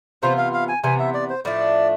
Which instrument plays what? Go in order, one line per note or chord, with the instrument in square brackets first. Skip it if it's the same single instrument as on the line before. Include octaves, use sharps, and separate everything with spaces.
[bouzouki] C3 E3 B3 F4 [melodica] C5
[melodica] F5
F5
G#5
[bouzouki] C3 E3 B3 [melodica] G#5
[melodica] E5
D5
C5
[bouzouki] A2 F3 A3 D4 [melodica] D5